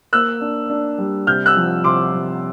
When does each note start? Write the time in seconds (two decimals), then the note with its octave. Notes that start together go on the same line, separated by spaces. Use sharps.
0.13 A#3 E6 F#6
0.41 D4
0.70 D4
0.98 G3
1.27 C3 F6 G6
1.46 E6 F#6
1.56 F3
1.84 C3 C6 D6
2.14 F3